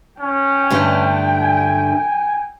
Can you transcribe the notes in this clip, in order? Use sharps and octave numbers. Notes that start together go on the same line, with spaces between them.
C#4 G5
G2 D3 A3
G#5